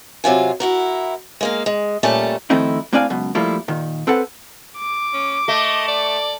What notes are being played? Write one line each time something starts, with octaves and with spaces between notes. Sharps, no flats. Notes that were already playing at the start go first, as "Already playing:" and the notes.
C3 F#3 F4 G#5
E4 F#4 A#4
G#3 A#3 F5
G#3
A#2 G3 A3 C#4 A4 A5
D#3 F3 A3 C4 D#4 E4
A2 C4 D4 D5 F5 G#5
C#2 F#2 B2
F3 G3 A3 A#3 E4 F4
A#2 D#3
C4 A4 B4 F#5
D6
C#4
A3 D#5
D5